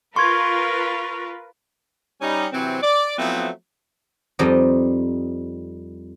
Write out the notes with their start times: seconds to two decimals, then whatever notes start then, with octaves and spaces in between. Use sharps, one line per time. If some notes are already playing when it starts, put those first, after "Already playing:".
0.16 F4 A#4 B4 C6 C#6 G#6
2.21 G3 C#4 D#4
2.52 C3 E3 F#3 C4
2.82 D5
3.18 F3 F#3 A3 B3 C4 E4
4.39 F2 G3 D#4 C5 D#5